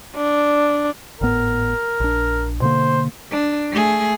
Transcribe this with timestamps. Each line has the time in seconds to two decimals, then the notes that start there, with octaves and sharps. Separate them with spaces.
0.16 D4
1.21 G#1 A2 B3 A#4
2.00 A#1 D4
2.62 B2 D3 A#3 C5
3.31 D4
3.71 A3 G#4